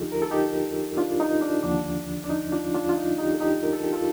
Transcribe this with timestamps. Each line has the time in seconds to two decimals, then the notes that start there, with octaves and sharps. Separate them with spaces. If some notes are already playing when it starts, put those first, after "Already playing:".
Already playing: D#2 D3 F3 D4 D#4 F4 G4 A4
0.12 A#4
0.22 A4
0.31 D#4 G4
0.97 D4 F4
1.20 D#4
1.41 D4
1.63 D#2 D3 F3 D4
2.24 D4
2.29 D#4
2.52 D4 F4
2.74 D4 F4
2.89 F4
2.97 D#4
3.18 D#4 G4
3.34 A4
3.40 D#4 G4
3.63 A#4
3.73 A4
3.83 G4
3.93 F4 A4